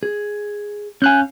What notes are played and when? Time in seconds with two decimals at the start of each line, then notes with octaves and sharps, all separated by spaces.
0.03 G#4
1.02 C#4 F5 G#5 F#6 G6